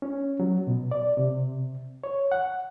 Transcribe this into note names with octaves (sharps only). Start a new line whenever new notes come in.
C#4
F#3
B2
D5
C3
C#5
F#5